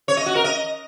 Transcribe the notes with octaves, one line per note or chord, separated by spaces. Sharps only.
C#5
D#5
F#4
A#4
D#5